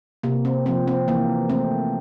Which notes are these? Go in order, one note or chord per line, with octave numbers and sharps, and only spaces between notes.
C3 A#3
C4
F3 A#3 C4
C4
E3 A#3
A3 C4